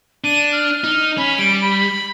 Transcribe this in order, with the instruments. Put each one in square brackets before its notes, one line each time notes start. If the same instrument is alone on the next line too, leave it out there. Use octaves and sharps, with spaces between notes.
[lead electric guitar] D4 [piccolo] D#7
[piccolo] F6
[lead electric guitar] D#4
[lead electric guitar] C#4 [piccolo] B5
[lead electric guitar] G3 [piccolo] D7
[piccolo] B5